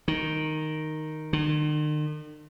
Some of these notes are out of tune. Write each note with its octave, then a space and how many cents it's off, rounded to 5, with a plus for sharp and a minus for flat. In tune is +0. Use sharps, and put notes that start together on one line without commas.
D#3 -5
D#3 -45